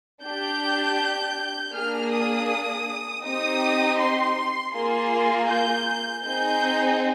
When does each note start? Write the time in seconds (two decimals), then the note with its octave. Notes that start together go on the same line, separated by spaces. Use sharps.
0.23 D4 G4 G6
1.74 A#3 D4 G#4 F6
2.11 D#6
3.24 C4 D#4 G4 D#6
3.99 C6
4.74 A#3 F4 G#4 C6
5.49 G6
6.25 C4 D#4 G#4 G6